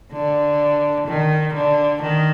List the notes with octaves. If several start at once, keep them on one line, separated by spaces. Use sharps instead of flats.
D3
D#3
D3
D#3